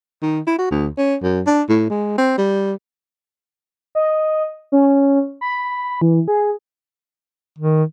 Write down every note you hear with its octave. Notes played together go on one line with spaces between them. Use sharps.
D#3
E4
F#4
D2
C#4
F#2
D4
A2
G#3
C4
G3
D#5
C#4
B5
E3
G#4
D#3